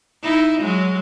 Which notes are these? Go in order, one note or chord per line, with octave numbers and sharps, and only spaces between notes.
D#4 E4
F#3 G#3